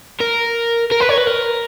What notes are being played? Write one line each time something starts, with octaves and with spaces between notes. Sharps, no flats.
A#4
A#4
B4
C#5
B4
A#4